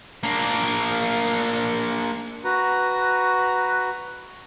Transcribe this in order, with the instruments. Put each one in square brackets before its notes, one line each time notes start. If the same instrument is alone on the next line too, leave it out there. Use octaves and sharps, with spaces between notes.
[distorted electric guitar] A#3 D4
[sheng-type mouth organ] F#4 B4 A#5